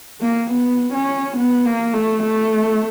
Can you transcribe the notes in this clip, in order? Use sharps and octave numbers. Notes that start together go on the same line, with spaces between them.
A#3
B3
C#4
B3
A#3
A3
A3